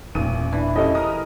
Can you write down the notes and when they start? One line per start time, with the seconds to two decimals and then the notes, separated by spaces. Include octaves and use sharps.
0.15 E1 A1 A#2 D#7
0.52 E3 D4
0.76 C#4 E4 G4 A4 D#5
0.95 A#4 D#6 F6